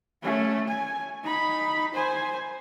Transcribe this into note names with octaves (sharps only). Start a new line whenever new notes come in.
A3 C#4
G#5
D#4 B5
C5 G#5